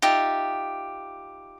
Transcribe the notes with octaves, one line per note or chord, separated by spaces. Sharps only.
D#4 F4 G4 E5